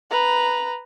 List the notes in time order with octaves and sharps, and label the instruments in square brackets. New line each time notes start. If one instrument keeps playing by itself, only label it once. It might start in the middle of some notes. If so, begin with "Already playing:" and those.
[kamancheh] B4 A#5